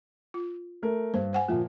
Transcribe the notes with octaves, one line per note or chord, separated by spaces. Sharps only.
F4
A3 A#4
G2 C5
C5 F#5 G#5
A#2 F3 A#3 E5